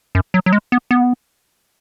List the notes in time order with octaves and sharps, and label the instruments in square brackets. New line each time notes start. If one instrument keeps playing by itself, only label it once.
[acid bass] F#2
F#3
F#3
G#3
B3
B3